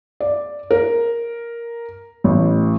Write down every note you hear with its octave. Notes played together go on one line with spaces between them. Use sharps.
D5
A#4
A1